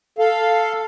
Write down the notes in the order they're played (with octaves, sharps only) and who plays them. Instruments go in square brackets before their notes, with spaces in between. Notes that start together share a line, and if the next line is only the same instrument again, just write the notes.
[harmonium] A4 F5